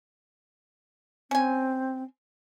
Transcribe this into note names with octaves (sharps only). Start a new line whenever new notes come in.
C4 C#4 G#5